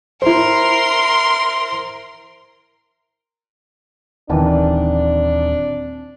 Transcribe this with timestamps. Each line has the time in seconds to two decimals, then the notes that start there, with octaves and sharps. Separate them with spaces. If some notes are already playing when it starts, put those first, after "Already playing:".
0.22 E4 A#4 C5 C6
4.30 D#1 D#3 E3 C4 D4 D5 A5